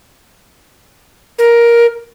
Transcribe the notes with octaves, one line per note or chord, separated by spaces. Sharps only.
A#4